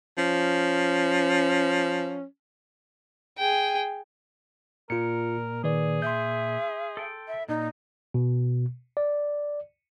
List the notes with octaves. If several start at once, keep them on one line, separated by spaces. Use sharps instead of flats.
F3 C#4
G#4 G5
A#2 F4 A#4 C#7
D#3 G#4 B4 D5
E5 C6 G6
A4 G5
E5
A#2 D#4
B2
D5